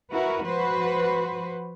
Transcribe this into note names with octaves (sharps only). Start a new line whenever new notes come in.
E4 F#4 A#4 B4
F3 F#4 B4 C5